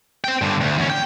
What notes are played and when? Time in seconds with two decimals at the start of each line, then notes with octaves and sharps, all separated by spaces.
0.24 C4 G5
0.41 G2 D3
0.61 D2
0.78 E2 C#4
0.90 G5